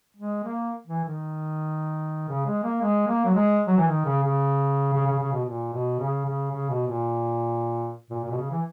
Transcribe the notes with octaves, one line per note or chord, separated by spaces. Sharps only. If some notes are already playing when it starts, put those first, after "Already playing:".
G#3
A#3
E3
D#3
C#3
G#3
A#3
G#3
A#3
F#3
G#3
F#3
E3
D#3
C#3
C#3
C#3
C#3
C#3
B2
A#2
B2
C#3
C#3
C#3
B2
A#2
A#2
A#2
B2
C#3
E3